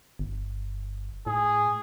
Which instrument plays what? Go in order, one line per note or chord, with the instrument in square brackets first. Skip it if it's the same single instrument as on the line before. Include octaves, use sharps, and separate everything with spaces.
[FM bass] G1
[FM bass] A2 [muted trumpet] G#4